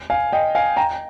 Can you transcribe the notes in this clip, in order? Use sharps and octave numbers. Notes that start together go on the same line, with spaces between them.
F5 G#5
D#5 G5
F5 G#5
G5 A#5